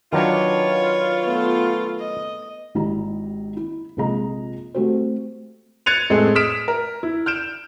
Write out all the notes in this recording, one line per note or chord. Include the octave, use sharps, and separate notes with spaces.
D#3 F#3 D4 F4 B4 C#5
A3 B3
D#5
G#1 D#3 E4 G4 D#5 A#5
E4
A#1 C3 G#3 D#5 A#5
A3 C4 F#4 G4 C5
F#6 G#6 A6 C#7 D#7 F7
A2 G#3 A3 C4 G#4
D#6 F6 B6 D7 E7
A#4
E4
F6 G6 D7 E7